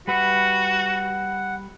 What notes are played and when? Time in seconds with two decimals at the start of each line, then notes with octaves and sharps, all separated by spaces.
0.08 G3 F#4 B4 E5 F#5